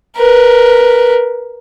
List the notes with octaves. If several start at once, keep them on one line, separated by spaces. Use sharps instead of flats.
A#4 B4